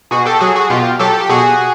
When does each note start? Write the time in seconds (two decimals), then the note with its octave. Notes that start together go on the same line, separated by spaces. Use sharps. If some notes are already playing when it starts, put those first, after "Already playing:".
0.11 B2 F#4 G#4
0.25 G4 A4
0.40 F#3 F#4 G#4
0.56 F#4 G#4
0.70 B2 F4 G4
0.99 F#3 G4 A4
1.20 G4
1.29 B2 F#4 G#4